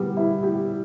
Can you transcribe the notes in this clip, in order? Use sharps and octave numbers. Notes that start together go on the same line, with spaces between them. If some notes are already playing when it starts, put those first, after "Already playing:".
Already playing: G3 B3
E4
G4